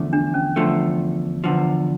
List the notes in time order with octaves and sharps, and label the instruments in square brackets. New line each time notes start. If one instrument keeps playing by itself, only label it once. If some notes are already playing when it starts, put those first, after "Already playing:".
Already playing: [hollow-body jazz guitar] E2 D3 F3 A3
[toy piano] D4
C#4
[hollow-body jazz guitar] E2 D3 F3 A3
E2 D3 F3